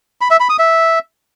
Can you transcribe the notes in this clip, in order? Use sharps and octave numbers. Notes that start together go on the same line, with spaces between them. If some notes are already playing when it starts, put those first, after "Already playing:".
B5
E5
B5
D#6
E5